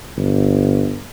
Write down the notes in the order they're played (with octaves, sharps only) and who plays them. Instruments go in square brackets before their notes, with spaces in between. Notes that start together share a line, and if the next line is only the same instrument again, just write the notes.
[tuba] G1